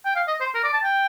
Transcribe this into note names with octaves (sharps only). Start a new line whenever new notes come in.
G5
F5
D#5
C5
A#4
D5
A5
G5